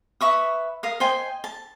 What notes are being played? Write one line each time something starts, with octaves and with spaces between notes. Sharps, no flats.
B4 E5 C#6 D#6
A#4 F5 D#6
C5 D#5 G5 G#5
A5